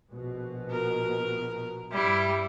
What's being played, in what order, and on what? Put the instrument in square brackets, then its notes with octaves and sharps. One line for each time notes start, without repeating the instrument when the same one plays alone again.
[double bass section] A#1 B2
[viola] A#4
[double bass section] G2 [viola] G3 E4